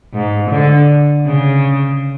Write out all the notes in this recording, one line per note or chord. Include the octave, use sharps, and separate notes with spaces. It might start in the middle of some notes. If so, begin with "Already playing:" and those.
G#2
D3
C#3